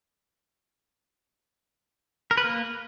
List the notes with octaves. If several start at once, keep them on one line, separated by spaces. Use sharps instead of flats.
A#4
B4
A#3